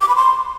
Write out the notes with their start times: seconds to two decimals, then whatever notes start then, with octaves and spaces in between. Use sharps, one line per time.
0.01 D6
0.09 B5
0.16 C6